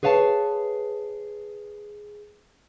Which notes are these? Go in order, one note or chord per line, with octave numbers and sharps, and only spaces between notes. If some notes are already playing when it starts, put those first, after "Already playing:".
G#4 B4 C#5 F5 G#5 A5